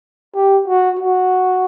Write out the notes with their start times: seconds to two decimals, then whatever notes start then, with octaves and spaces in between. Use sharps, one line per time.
0.35 G4
0.68 F#4
0.99 F#4